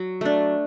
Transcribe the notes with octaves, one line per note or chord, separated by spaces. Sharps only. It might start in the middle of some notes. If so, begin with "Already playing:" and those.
Already playing: F#3
A3 D4